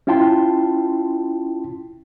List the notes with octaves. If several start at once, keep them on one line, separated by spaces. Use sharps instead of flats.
C#4 E4 F4 G5 A5 C6